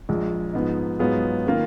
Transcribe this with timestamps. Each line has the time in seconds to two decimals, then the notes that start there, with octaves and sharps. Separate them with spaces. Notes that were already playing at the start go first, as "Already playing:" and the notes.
0.09 A#1 A#2 G#3
0.53 G#2 F3 B3 D#4
0.99 G#2 F#3 B3 F4 G#4
1.47 D#3 A#3 F4